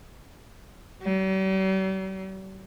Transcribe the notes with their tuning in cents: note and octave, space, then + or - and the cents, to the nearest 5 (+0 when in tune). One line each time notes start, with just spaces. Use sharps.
G3 -45